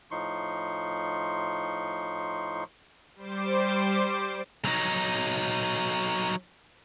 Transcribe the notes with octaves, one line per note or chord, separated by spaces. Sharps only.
A2 F3 D#4 C6 C#6
G3 C5 D6
F#3 D#4